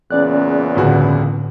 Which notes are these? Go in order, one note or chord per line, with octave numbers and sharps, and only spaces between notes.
E2 A#2 C#3 C#4 D5 F#6
G1 C#2 A2 D3 F#4